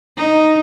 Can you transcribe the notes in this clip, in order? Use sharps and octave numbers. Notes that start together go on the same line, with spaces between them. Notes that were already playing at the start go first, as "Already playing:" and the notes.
D#4